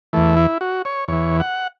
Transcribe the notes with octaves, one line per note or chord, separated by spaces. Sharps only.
E2 E3 A3
E4
F#4
C#5
E2 E3 C#5
F#5